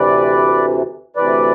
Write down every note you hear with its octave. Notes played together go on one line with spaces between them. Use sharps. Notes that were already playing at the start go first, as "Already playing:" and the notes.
Already playing: D2 C3 E3 B4 D5
D2 C3 E3 B4 D5